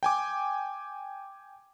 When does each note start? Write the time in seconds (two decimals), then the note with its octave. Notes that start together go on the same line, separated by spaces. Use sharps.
0.03 G5 G#5 D6